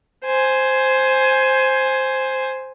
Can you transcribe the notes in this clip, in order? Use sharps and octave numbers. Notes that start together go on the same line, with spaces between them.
C5 G#5